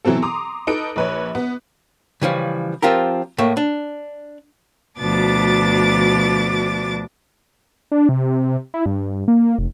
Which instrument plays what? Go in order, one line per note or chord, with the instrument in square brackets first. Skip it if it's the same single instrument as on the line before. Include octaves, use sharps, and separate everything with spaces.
[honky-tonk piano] B2 E3 F#3 C4 A4
A#5 C6 D6 D#6
D#4 A4 B4 D7
A#1 B4 C#5
B3
[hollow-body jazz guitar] C#3 E3 F3 G3
F3 C4 F4 G4 A#4
A2 A3 A#3
D4
[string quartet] D2 B2 F3 D4 D6 A6
[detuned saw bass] D4
C3
E4
G2
A#3
F1